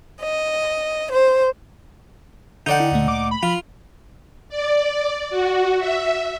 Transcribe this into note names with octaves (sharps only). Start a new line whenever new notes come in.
D#5
C5
D3 D#4 D5 F#5 G6
E4 G5
D2 A#2 A3
D6
B5
F3 F4
D5
F#4
E5